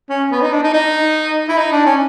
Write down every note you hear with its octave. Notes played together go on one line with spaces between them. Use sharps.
C#4
B3
D#4
D4
D#4
D#4
E4
D#4
D4
C#4